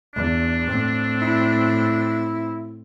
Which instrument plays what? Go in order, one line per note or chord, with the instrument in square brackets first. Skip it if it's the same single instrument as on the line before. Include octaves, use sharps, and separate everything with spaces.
[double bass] E2 [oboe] D4
[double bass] A2 C4
[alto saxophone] E4